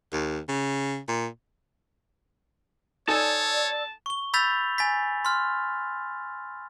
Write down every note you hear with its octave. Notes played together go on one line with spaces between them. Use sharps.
D#2
C#3
A#2
D#4 A4 C#5 D5 G#5 A5 E6
C#6 G7
B5 E6 G6 A6 B6 F7
G#5 A6 B6
C6 F6